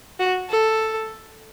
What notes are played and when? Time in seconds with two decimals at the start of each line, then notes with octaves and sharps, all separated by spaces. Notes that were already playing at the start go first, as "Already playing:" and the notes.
0.19 F#4
0.50 A4